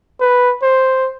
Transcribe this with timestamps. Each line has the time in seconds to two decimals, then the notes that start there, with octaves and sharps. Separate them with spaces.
0.21 B4
0.62 C5